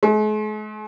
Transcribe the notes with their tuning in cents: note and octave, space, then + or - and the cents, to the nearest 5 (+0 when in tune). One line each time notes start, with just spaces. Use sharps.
G#3 +45